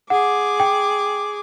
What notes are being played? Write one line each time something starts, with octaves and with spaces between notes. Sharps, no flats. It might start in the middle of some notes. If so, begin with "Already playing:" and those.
G#4 F#5 D6
G5